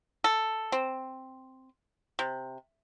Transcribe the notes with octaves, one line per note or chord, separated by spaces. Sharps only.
A4
C4
C3